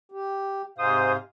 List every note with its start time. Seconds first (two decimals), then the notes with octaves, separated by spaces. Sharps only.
0.12 G4
0.78 G#2 C3 C5 F5 D#6